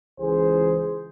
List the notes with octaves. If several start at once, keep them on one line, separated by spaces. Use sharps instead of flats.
C#2 E3 G#4 C5